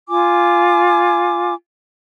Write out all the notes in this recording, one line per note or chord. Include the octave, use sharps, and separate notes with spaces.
F4 G#5 D6